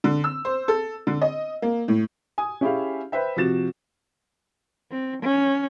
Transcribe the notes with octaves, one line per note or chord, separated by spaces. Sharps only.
D3
E6
C5
A4
D3
D#5
A#3
A2
G#5 D#6
C#4 E4 G4 G#4 E5 F5
B4 C5 E5 G5
C3 F3 F#4 A6 E7
C4
C#4